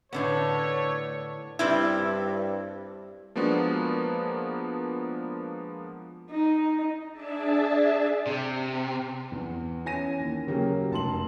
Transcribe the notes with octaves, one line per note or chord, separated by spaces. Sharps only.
A2 D3 A3 B3 C#5
G2 G3 C4 E4
F3 G#3 A#3 B3 D4 F#4
D#4
D4 G#4 D5 E5 A5
C3
E2
E3 C#4 G#5 A#6 D#7
D#2
C#3 F#3 A#3 G4
F1 A5 C6 F#7